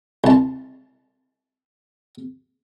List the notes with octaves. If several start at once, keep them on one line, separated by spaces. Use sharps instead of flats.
C2 A5